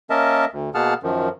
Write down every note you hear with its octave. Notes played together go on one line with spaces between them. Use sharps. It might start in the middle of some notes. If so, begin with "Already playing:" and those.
A#3 C#4 A#4 D#5 E5 A5
D2
B2 A#3 G#4 F#5 A5 F6
F#2 D#3 F3